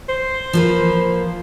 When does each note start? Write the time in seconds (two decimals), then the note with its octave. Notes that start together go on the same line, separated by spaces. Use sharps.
0.09 C5
0.53 F3 A#3 B4